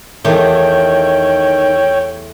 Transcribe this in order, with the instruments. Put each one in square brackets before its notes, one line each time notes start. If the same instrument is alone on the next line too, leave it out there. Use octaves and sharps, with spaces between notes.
[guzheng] E2 A3 G4 [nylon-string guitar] D#3 [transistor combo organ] C#5 G5